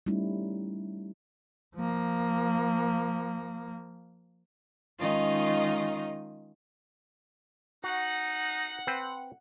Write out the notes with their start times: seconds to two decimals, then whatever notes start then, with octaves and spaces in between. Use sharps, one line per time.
0.06 G3 A3 C#4 D#4 E4
1.76 F3 A#3
4.99 D#3 G#3 C#4 D#4 F4 D#5
7.84 D#4 F#4 F#5
8.87 C4 B4 C5